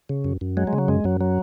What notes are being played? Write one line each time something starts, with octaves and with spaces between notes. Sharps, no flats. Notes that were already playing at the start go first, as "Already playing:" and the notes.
C#3
F#2
F#2
F#3 G#3
G#3
C#3
F#3
F#2 G#3
F#2 F#3
F#3